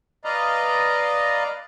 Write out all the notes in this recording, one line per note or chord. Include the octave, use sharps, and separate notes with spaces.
B4 D5 D#5 F5 A#5